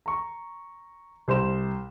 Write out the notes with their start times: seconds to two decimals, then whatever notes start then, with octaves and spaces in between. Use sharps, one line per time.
0.06 A#5 C#6
1.28 C2 C5 C6 E7